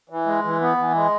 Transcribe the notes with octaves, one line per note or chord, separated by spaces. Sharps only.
E3
G#3
E3
B3
E3
G#3